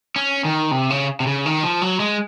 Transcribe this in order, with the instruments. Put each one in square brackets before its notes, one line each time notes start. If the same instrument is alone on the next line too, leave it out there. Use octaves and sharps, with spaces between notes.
[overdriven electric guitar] C#4
D#3
C3
C#3
C3
C#3
D#3
F3
F#3
G#3